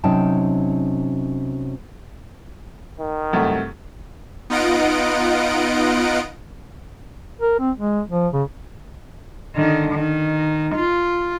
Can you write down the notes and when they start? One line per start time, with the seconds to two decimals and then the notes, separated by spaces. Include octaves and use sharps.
0.04 C3 F#3 C#4 D#4 G5 A5
3.00 D#3
3.33 C2 F#2 A3
4.50 B3 D#4 F4 D#5 F#5 D7
7.41 A#4
7.60 C4
7.77 G#3
8.10 F3
8.33 C#3
9.55 D3 D#3
9.93 D#3
10.75 F4